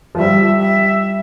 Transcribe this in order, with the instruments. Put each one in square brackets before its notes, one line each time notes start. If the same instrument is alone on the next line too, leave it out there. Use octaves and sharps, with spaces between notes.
[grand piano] F3
[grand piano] G3 [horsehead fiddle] E5
[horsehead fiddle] E5